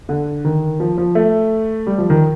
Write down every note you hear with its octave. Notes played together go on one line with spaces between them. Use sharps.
D3
D#3
F3
F3
A3
G3
F3
D#3